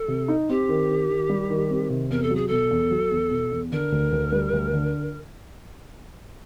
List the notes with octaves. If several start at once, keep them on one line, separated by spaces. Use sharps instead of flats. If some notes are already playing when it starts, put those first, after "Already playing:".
Already playing: A4
C3
D#4
C4 G4
D#3
D#3
D#3
G3
D#3
C4
C3
E2 A#4
A4
F#3 G#4
B2 A4
E2
F#3
E2
B2
E2
D3 A#4
D2
D2
G3
D2
D3